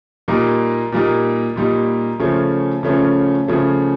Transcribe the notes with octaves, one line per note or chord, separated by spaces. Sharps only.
A#2 G3 A#3 D#4
A#2 G3 A#3 D#4
A#2 G3 A#3 D#4
C#3 F3 A3 C#4
C#3 F3 A3 C#4
C#3 F3 A3 C#4